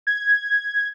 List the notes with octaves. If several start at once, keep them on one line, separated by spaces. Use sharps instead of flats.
G#6